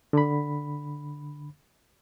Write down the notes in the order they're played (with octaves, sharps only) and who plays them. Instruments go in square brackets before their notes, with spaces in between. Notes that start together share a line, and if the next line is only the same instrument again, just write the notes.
[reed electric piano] D3 B5